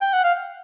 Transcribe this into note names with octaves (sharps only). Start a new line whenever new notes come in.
G5
F#5
F5